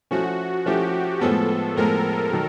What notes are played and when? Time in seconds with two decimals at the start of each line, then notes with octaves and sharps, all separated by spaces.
0.11 F3 A3 C#4 E4 F#4
0.66 F3 A3 C#4 E4 G4
1.21 A2 F3 G#3 B3 A4
1.76 A2 F3 G#3 B3 A#4
2.32 D#3 F#3